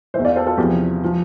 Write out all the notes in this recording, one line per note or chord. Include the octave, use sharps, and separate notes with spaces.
E2 E3 C5 E5
D5 F5
A4 C5
F4 A4
E2 C3 F3 E4 G4
F3